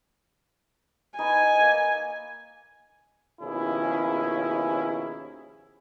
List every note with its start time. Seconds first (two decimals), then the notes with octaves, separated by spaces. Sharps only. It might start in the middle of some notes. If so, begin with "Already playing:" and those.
1.19 D#4 B4 G#5 C#6
1.58 A#3 D#5 E6
3.41 D#2 B2 F3 C#4 E4 G#4